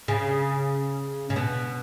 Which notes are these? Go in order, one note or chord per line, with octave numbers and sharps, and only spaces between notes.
C#3
C#3
B2